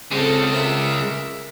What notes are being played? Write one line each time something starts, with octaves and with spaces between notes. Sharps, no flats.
C#3 G#3 C4 A4
A#4 E5